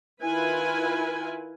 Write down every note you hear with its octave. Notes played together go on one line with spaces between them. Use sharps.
D#3 E4 F4 B4 G#5